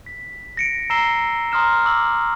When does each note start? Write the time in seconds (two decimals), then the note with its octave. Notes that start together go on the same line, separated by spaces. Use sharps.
0.06 B6
0.57 A#6 C#7 D7
0.90 A#5 E6 A#6 C7 E7 G7
1.52 A#5 C6 D#6 F6 E7
1.85 D6 E6 F#7